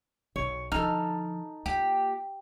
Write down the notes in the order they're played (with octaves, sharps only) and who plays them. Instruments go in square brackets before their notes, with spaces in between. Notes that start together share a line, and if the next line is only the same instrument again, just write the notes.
[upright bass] B1 [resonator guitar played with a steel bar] C#5
[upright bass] D3 F3 [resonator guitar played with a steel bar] D#4 A4 [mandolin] F6
[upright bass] A#3 F4 [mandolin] G4